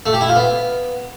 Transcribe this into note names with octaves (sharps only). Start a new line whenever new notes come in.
A3
G4
E4
F4
B3